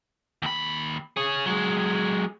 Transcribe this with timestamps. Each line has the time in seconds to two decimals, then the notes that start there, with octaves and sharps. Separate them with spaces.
0.42 D#2 B5
1.17 G#4 C#5
1.46 F#3 G#3